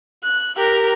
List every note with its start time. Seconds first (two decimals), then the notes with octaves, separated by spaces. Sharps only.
0.23 F#6
0.57 G4 A#4